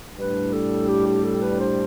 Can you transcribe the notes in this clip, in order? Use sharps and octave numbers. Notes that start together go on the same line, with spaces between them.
A2 G3 D4 B4
A4
G4
G4
A4
B4
C5